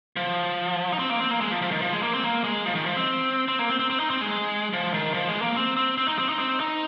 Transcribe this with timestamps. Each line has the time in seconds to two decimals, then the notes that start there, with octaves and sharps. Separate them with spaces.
0.16 F3
0.92 D#4
0.99 C4
1.10 A#3
1.20 C4
1.31 A#3
1.41 G#3
1.51 F3
1.62 F3
1.71 D#3
1.82 F3
1.93 G#3
2.03 A#3
2.13 C4
2.24 A#3
2.44 G#3
2.66 F3
2.75 D#3
2.86 F3
2.96 C4
3.48 C4
3.59 A#3
3.69 C4
3.79 C4
3.90 C4
4.00 D#4
4.10 C4
4.21 G#3
4.73 F3
4.94 D#3
5.14 F3
5.29 G#3
5.42 A#3
5.56 C4
5.77 C4
5.98 C4
6.08 D#4
6.19 C4
6.29 D#4
6.39 C4
6.60 D#4